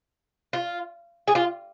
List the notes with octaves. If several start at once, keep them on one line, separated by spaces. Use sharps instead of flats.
F4
G#4
F4